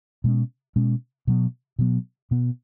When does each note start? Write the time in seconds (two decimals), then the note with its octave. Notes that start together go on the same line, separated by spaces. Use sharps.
0.24 B2 G#3 C#4
0.76 B2 G#3 C#4
1.27 B2 F#3 B3
1.79 B2 F#3 B3
2.31 B2 B3